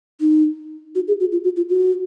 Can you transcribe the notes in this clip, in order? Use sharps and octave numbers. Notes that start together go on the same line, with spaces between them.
D#4
F#4
G#4
F#4
F4
F#4
F4
F#4